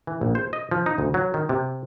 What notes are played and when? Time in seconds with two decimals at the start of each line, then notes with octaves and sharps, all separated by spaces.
0.07 E3
0.21 A#1
0.35 C5
0.53 D#5
0.71 F3
0.86 D#4
0.98 D2
1.14 F#3
1.34 D#3
1.49 C3